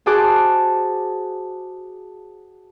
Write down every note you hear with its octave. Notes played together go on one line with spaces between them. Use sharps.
F#4 G#4 C5 A5 D6 F#6